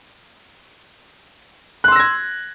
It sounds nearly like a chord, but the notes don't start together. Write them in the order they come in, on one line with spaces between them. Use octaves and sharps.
F#6 C6 E6 A#6 G#6